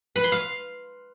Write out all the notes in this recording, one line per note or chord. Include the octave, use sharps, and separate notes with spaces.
B4
C6
F5